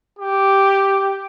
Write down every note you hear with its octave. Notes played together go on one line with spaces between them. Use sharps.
G4